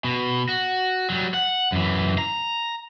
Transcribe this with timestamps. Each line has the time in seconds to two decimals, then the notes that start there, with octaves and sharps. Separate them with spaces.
0.04 B2
0.49 F#4
1.10 F#3 G3
1.34 F#5
1.72 F#2 E3
2.18 A#5